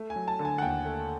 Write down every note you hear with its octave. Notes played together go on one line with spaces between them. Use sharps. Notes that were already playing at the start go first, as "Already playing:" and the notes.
Already playing: A3
G#5
F#3
A5
D3
G#5
F#5
D#2 G5
A3